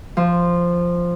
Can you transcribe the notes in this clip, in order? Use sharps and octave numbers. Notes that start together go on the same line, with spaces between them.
F3